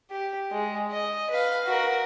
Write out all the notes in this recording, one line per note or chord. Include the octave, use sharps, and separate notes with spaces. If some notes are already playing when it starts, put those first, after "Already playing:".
G4
G#3
D#5
B4 F5
F#4 A#4